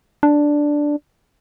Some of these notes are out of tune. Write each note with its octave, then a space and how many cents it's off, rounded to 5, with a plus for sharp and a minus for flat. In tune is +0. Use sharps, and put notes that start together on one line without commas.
D4 +0